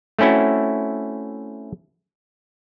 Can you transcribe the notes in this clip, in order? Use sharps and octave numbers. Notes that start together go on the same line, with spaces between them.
A3 C4 C#4 E4 F#4